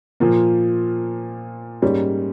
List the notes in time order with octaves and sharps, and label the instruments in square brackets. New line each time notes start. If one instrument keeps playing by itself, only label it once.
[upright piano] A#2 F3 A#3
G#2 G3 A#3 C#4